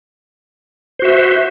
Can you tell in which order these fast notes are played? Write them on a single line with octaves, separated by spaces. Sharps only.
C5 F#4 E5